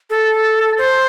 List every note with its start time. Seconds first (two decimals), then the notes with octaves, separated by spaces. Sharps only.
0.10 A4
0.78 C5